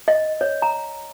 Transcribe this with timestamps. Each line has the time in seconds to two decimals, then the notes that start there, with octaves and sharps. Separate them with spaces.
0.08 D#5
0.41 C#5
0.62 A#5